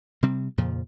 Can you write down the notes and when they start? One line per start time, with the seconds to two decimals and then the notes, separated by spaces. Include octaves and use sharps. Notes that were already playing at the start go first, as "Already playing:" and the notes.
0.23 C3 G3 C4
0.58 F2 A#2 C#3 F3